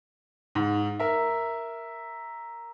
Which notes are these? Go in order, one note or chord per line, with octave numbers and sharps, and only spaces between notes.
G#2
A#4 E5